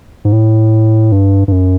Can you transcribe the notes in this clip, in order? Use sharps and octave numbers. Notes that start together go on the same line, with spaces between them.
G#2
A2
G2
G2
F#2